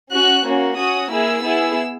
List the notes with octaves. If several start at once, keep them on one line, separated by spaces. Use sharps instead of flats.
C#4 F#4 F#6
A#3 C#4 F#4
C#4 F#4 D#6
A#3 E4 G#4 E6
B3 E4 G#4